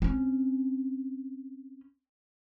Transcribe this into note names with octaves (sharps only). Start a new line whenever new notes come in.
C4 C#4